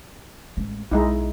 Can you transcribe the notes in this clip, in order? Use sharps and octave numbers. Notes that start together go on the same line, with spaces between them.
A1 G#3
B1 G#3 D#4 E4